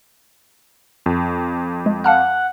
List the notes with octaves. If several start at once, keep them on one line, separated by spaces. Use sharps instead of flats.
F2
G#3
F5 F#5 A5 F6